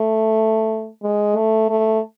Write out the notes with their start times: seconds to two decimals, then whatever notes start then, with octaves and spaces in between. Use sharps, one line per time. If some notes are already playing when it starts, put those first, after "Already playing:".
Already playing: A3
1.03 G#3
1.37 A3
1.70 A3